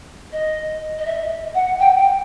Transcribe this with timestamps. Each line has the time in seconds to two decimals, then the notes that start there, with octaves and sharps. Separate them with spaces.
0.32 D#5
0.98 D#5
1.05 E5
1.54 F#5
1.79 G5
1.97 G5